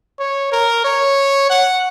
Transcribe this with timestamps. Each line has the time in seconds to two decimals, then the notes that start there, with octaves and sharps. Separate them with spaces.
0.19 C#5
0.52 A#4
0.85 C#5
1.50 F#5